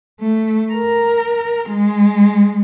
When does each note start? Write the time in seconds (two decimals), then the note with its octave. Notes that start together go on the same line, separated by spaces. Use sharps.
0.21 A3
0.73 A#4
1.70 G#3